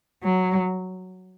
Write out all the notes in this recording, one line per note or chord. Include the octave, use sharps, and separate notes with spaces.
F#3